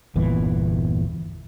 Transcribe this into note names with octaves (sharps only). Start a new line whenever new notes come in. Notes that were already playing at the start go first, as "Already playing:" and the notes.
G1 E2 A#2 E3